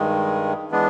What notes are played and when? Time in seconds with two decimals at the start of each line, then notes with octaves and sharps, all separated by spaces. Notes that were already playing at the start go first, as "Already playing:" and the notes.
Already playing: G2 D#3 G#3
0.71 E3 G#3 B3 D4